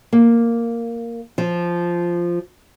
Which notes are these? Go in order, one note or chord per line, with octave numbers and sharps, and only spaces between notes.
A#3
F3